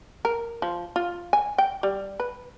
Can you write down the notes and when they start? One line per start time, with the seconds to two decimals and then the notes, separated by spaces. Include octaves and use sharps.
0.25 A#4
0.62 F3
0.96 F4
1.33 G#5
1.58 G5
1.83 G3
2.20 B4